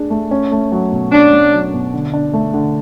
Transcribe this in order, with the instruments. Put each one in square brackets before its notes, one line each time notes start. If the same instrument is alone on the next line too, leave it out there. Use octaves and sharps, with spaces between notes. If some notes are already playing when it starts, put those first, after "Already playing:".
Already playing: [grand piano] A3 D4 G#4
A3
C#4
A3
F#3
B2
[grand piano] C#4 [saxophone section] D4
[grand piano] A3
F#3
B2
D3
D4
A3
D3